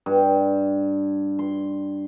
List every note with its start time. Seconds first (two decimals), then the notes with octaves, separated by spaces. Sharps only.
0.06 G2
1.39 C6